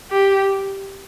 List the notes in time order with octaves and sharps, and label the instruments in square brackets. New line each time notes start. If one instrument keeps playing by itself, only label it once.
[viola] G4